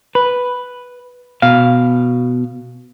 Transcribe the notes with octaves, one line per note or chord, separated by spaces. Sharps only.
B4
B2 F5